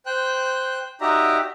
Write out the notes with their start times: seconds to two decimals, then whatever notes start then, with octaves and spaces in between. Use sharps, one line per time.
0.06 C5 G5 F#6
1.01 D#4 F#4 G4 D5 E5 A#5